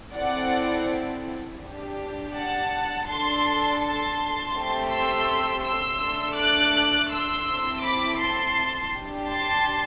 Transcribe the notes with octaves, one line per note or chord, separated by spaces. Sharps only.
C4 E4 A4 D5 F#5
D4 G4
F#5 A5
D4 A4 A5 C6
A5 C6
A3 C4 G4
C6 E6
C6 E6
A3 D4 A4
D6 F#6
C6 E6
C4 E4 A4
B5 D6
A5 C6
D4 G4
A5 C6